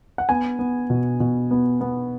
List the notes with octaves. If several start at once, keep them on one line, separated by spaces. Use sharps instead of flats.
F#5
B3 G#5
B3
B2
B2
B3
B3